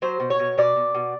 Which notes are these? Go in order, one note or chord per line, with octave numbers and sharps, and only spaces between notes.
F#3 C5
B2
C#5
B2
B2 D5
B2
B2